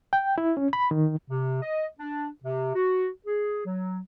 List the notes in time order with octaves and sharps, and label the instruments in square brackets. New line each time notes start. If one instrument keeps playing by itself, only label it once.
[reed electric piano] G5
E4
C#4
B5
D#3
[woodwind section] C3
D#5
D4
C3
F#4
G#4
F#3